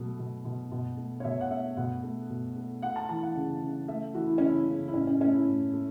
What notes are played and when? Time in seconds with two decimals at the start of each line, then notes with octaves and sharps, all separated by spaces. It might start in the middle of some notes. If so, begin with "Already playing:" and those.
Already playing: B2 F#3 A3
0.19 B2
0.45 B2
0.72 B2
0.97 A3
1.20 C#5
1.24 B2 E5
1.41 F#5
1.51 A3 E5
1.76 B2 F#5
2.03 A3
2.30 B2
2.56 A3
2.82 A3 F#5
2.96 A5
3.09 E3 A5
3.23 F#5
3.36 C#3
3.62 C#3
3.88 A3 E5
4.14 E3 F#4
4.27 E4
4.38 C#3 C#4
4.49 E4
4.68 C#3
4.88 E4
4.93 A2 C#4
5.07 C#4
5.20 A3 C#4
5.33 E4
5.47 A2
5.73 A3